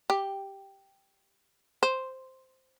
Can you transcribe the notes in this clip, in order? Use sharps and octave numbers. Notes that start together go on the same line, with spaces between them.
G4
C5